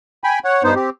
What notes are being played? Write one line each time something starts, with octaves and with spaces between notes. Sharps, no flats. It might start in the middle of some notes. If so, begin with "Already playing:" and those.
G5 G#5 B5
C#5 F#5
G2 B3 D#4 C5
C4 G4